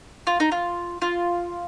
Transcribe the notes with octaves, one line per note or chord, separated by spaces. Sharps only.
F4
D#4
F4
F4